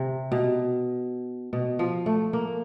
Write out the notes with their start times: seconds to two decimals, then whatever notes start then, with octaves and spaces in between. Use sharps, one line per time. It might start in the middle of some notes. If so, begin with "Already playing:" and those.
Already playing: C3
0.32 B2
1.53 B2
1.79 F3
2.06 A3
2.33 A#3